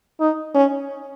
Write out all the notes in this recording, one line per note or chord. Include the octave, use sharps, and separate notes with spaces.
D#4
C#4